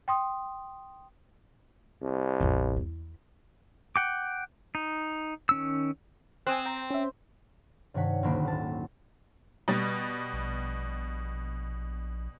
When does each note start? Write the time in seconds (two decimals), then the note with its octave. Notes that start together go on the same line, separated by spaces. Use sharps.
0.08 G5 C6 D#6
2.02 C2
2.41 A1 E2
2.77 E2 E4
3.96 F#5 G5 D6
4.75 D#4
5.49 D#3 C#4 E6
6.47 C4 G#5 D#6 F#6
6.66 G5 A#5
6.91 C#4 E5
7.94 G2 C3 D#3 C#5 F#5 B6
8.23 D#1 D2 F#3 A#3 B5 D7
8.44 G#1 A5
9.68 B2 G3
10.33 A#1